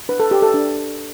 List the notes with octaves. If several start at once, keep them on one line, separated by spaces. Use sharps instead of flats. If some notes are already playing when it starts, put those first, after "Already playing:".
D4 B4
A4
G4
A4
D4